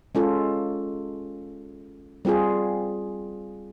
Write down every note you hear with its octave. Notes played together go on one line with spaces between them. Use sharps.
G#3 C#4 F4 A4
G3 C4 F4 G#4